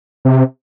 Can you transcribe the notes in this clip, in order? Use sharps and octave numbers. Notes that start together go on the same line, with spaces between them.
C3